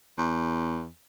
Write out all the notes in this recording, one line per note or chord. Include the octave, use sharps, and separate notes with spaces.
E2